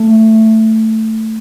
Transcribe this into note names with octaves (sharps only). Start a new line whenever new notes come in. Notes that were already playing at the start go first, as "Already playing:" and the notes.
Already playing: A3